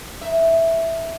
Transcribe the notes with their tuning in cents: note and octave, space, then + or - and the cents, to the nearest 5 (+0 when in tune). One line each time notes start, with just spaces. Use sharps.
D#4 +0 E5 +0